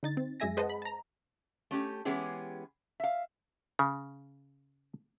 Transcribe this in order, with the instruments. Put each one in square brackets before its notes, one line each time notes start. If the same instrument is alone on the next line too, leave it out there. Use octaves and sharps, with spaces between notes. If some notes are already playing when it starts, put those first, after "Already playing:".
[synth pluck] D3 D#4 A6
C4
F#2 G#3 G#4 E5 G#5 A#6
G#4 B4 C5 D#5 F#5 A5
B5
A5 A#5
[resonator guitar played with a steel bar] A3 C#4 G4
E3 G#3 B3 C#4 G4 G#4
E5 F5
[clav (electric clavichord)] C#3